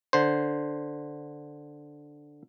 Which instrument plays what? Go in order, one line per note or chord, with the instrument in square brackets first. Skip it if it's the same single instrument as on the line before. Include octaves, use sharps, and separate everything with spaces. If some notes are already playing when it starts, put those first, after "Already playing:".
[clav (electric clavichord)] D3 C5